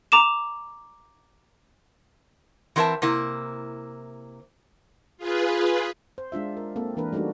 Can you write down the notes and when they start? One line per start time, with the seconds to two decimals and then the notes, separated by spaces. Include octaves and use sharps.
0.12 A#5 D6 E7
2.76 E3 C4 A#4 C#5 E5 A5
3.02 C3 A#3 E4
5.18 F4 G#4 B4
6.18 C5
6.32 G#3 D4 F4 E5
6.57 A#4
6.76 A#3 C4 A4
6.97 E3 A#3 D4 A#4 B4
7.13 G3 A3 D4 D#4 F#4